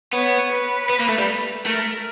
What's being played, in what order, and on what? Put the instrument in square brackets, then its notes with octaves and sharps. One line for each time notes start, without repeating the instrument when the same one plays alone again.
[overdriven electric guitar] B3 [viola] C#5
[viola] B4
[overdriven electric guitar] B3
A#3
A3
G3
[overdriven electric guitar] A3 [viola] A#4